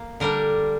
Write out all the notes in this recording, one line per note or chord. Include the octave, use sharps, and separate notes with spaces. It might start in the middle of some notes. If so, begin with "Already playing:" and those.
Already playing: A#3
D3 G3 D4 A#4